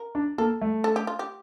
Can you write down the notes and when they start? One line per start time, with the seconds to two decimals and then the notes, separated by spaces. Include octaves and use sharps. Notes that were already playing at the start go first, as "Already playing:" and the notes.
Already playing: A#4
0.15 D4
0.38 A#3 A4
0.61 A3
0.84 A4
0.96 G4
1.07 F4
1.19 G4